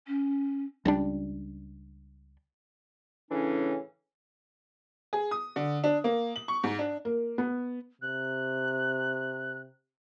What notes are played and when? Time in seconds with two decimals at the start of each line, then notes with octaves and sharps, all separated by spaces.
0.07 C#4
0.85 C#2 G3 D4
3.31 A2 C#3 E3 C#4 D4
5.13 G#4
5.31 D#6
5.56 D3
5.84 D4
6.04 A#3
6.36 F#7
6.48 C#6
6.64 G#2
6.79 D4
7.05 A#3
7.38 B3
8.01 C3 F#6